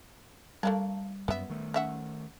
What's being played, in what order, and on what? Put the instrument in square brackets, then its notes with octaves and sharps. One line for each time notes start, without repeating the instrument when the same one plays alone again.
[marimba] G3 [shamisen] A3 A#3 D4
[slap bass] F#2 [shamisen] B3 E5
[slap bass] D#3 A3
[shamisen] C#4 E5 F#5